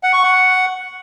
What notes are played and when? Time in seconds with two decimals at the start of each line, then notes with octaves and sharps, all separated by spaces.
0.03 F#5
0.13 C#6
0.23 F#5